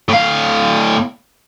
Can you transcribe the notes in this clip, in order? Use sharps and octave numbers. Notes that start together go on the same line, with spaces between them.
A2 F5